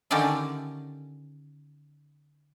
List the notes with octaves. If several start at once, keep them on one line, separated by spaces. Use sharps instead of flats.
D3 D#3 C#4 G4 D5 E5